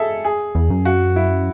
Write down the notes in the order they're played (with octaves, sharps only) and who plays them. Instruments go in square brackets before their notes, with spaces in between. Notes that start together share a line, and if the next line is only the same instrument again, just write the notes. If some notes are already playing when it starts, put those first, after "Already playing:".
Already playing: [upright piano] G#4 A4 E5
G#4
[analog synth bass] E2
F#2
[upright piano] F#4
E4